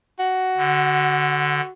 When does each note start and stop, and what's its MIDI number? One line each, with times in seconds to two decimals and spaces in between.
0.19 1.70 66
0.57 1.61 50